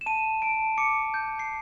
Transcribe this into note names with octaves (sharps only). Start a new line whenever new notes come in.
E7
A5 D#7
A5 D7
D6 C#7
G6
C7